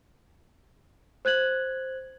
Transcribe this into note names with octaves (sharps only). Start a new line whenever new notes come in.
C5 F#6 G#6 F#7